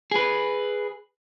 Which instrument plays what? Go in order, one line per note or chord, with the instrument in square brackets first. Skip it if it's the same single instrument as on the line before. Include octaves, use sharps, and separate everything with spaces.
[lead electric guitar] G#4 B4